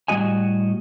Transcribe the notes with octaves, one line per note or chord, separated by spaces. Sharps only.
A2 G3 E4 F#4 D#5 G#5